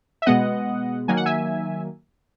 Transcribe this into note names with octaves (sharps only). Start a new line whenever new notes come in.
E5
B2 G#3 B3 D#5 F#5
D#3 F#3 A#3 G#5
F#5
E5 G#5